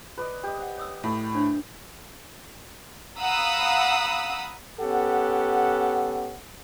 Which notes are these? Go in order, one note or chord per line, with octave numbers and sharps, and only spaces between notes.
B4 D5 D#5
G4 D#5
C5 F#5
C#5 D#6 E6
A2
D4 C5 C#5
F5 F#5 A#5 B5 D#6 E6
B3 C#4 G4 A4 F#5